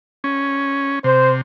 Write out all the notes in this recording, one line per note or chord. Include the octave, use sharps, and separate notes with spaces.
C#4
C3 C5